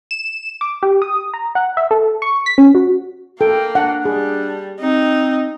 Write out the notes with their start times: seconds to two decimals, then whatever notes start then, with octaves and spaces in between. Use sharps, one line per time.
0.11 E7
0.61 D6
0.83 G4
1.02 D#6
1.34 A#5
1.55 F#5
1.77 E5
1.91 A4
2.22 C#6
2.46 B6
2.58 C#4
2.75 F#4
3.41 A#3 A4 G5
3.75 D4 F#5
4.05 G3 G#4
4.80 C4 D#4